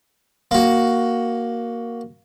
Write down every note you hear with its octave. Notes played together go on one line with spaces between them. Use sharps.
A#3 F#4